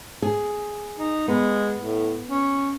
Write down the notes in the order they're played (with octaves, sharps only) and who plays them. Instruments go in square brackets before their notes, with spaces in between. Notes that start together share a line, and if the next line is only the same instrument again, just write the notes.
[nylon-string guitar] G#4
[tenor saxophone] D#4
[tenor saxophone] G#3 [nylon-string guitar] B3
[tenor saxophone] A2
C#4